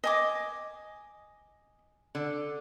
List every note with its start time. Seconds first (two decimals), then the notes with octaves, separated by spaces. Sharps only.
0.04 D#5 G#5 D6
2.15 D3